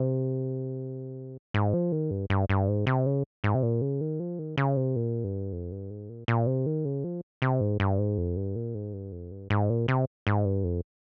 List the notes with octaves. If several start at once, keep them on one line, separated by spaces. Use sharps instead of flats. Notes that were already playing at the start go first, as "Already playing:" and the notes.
Already playing: C3
G#2
F3
D#3
G2
G2
G2
G#2
C3
C#3
G#2
C3
A#2
C#3
D#3
F3
D#3
C#3
C3
A#2
G2
F2
G2
G#2
A#2
A#2
C3
D#3
C#3
F3
C3
G#2
G2
G#2
F2
G2
A#2
G#2
G2
F2
G2
G#2
A#2
C3
G#2
G2
F2